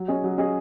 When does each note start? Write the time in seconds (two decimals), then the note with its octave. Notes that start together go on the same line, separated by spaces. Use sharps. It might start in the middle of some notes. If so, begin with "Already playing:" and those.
Already playing: F#3
0.08 C#4 G#4 D#5
0.24 F#3
0.38 C#4 G#4 D#5